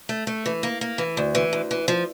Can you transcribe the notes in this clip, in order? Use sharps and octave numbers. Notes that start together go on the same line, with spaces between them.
A3
A3
E3
A#3
A#3
E3
D2
E3
D2
E3
F3